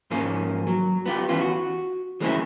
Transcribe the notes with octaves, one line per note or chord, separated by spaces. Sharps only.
G#2 F3 A#3 C#4
F#3
B3 F4 G4
E3 B3 C#4 F4
F#4
E3 G#3 A#3 C4 C#4 E4